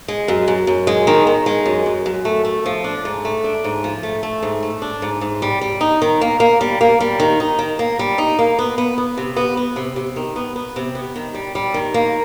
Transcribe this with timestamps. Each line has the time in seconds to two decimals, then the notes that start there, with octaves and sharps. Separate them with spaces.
0.08 G#3
0.28 F#2
0.48 F#2
0.67 F#2
0.87 G#3
1.07 D#3
1.27 D#3
1.46 G#3
1.66 F#2
1.86 F#2
2.06 F#2
2.25 A3
2.45 A3
2.66 F3
2.84 D4
3.05 G#2
3.25 A3
3.44 D4
3.64 G#2
3.84 F3
4.03 A3
4.23 A3
4.43 G#2
4.63 A3
4.82 D4
5.02 G#2
5.21 G#2
5.42 G3
5.61 G3
5.81 D#4
6.02 D#3
6.21 A#3
6.40 A#3
6.61 G3
6.81 A#3
7.00 G3
7.20 D#3
7.40 D#4
7.59 D#3
7.79 A#3
7.99 G3
8.18 D#4
8.39 A#3
8.59 B3
8.78 B3
8.98 B3
9.17 C3
9.37 B3
9.57 B3
9.76 C3
9.96 C3
10.16 D#3
10.36 B3
10.56 B3
10.76 C3
10.95 B3
11.16 D#3
11.35 G3
11.55 G3
11.74 D#3
11.94 A#3